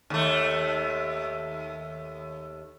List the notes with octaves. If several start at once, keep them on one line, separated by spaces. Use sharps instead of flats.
D#2 A3